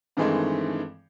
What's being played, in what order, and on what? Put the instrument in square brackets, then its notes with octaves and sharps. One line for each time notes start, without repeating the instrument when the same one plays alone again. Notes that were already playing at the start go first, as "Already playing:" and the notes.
[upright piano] G2 D#3 E3 G#3 A3 C4